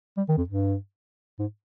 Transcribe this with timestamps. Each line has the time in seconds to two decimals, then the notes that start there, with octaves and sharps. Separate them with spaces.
0.17 G3
0.29 D#3
0.38 F2
0.48 G2
1.39 G#2